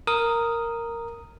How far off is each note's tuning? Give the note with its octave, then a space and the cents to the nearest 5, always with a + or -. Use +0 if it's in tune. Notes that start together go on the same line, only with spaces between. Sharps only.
A#4 -5 D#6 +0